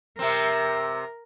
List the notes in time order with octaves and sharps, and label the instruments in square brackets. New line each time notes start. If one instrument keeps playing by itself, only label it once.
[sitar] C3 C4 [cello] A#4